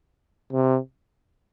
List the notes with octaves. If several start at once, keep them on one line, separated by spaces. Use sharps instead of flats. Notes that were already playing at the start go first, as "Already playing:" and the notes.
C3